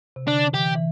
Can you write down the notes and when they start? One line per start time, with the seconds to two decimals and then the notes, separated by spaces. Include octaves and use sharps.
0.16 C3
0.28 D3 D4
0.54 E3 G4
0.75 E3